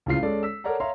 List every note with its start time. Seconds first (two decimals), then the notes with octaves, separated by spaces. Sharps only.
0.06 C#2 A2 C#3 F4 C7
0.23 G#3 C#4 A4 D5
0.43 E6 B6
0.64 A4 A#4 C#5 D5 F#5 A#5
0.80 C#5 E5 F5 A#5 C6